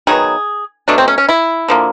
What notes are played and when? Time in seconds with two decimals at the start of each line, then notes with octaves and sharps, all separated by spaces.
0.07 D#3 F#3 B3 G#4
0.88 B2 F#3 A3 D4
0.98 C4
1.08 C#4
1.18 C#4
1.29 E4
1.68 D3 F3 A#3